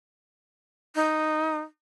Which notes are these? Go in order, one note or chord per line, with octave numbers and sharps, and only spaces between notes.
D#4